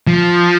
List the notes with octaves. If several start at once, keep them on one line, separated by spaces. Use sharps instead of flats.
F3